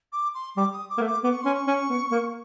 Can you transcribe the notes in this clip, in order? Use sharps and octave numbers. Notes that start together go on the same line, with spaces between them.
D6
C6
G3 D6
D#6
D6
A#3
A3
D6
B3 D6
C#6
C#4 C6
C#6
C#4
B3
A#3